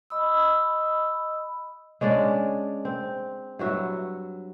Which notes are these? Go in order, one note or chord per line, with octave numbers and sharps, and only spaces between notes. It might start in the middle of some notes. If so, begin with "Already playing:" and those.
D#5 B5 D#6 E6
G#3 C#4 D4 D5
C4
G2 F#3 F#4 E5